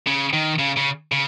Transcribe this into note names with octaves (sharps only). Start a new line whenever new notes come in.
C#3
D#3
C#3
C#3
C#3